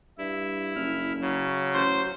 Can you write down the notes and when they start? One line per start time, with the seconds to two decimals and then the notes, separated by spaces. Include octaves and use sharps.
0.18 G2 E4
0.76 F#1 F6
1.21 C#3 F#3
1.74 A1 C5